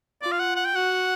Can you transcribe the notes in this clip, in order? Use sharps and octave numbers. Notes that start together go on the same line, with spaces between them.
F4 D5
F5
F#5
F#5
G5
F#4 F#5